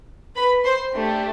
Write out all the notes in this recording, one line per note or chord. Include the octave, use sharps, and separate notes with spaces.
B4 B5
C5 C6
A3 D4 G4